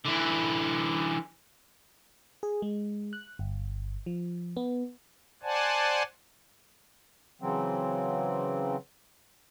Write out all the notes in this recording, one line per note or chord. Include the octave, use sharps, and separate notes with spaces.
D3 E3
G#4
G#3
F#6
G1
F3
B3
C5 D5 F#5 G#5 A5
C#3 E3 F#3 C4